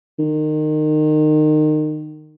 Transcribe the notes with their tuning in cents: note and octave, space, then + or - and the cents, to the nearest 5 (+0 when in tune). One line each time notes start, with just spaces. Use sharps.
D#3 -25